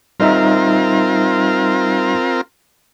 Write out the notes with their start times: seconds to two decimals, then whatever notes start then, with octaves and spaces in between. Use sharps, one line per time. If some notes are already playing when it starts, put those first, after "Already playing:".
0.20 G3 C4 D#4 F4 A#4 E5